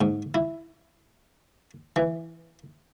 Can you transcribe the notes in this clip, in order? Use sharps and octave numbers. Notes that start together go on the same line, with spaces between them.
G#2
E4
E3